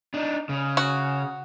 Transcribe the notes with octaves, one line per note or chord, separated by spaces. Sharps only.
D4 D#4
C#3
F#4